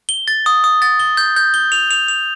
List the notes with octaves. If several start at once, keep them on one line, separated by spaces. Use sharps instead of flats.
G7
A6
D#6
D#6
A6
G7
G6
G6
G7
F7
F7
F7